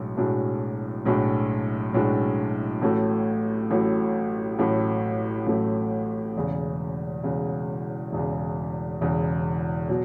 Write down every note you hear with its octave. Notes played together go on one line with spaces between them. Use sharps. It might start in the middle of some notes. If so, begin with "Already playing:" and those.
Already playing: B1 A2 G#3 D4
B1 A2 G#3 D4 F#4
B1 A2 G#3 D4 F#4
B1 A2 G#3 D4 F#4
A1 A2 F#3 A3
A1 A2 F#3 A3
A1 A2 F#3 A3
A1 A2 F#3 A3
E1 E2 C#3
E1 E2 C#3
E1 E2 C#3
E1 E2 C#3
B2 F#3